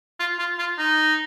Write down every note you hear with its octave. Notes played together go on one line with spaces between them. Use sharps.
F4
F4
F4
D#4